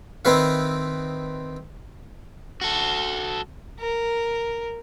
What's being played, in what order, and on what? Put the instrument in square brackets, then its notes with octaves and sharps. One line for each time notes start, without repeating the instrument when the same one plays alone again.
[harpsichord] D#3 C4 E4 B4 F5
[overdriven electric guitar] F#4 A4
[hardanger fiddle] A#4